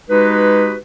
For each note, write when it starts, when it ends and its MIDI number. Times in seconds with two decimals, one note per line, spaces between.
0.10 0.75 56
0.10 0.75 63
0.10 0.75 66
0.10 0.75 67
0.10 0.75 71